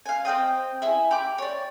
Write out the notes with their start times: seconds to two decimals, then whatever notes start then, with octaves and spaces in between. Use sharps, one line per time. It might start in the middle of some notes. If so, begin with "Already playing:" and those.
0.06 F5 G#5
0.25 C4 D#5 G5 D#6
0.82 E4 G#4 E5
1.11 G4 B5 D6
1.38 C#5 D5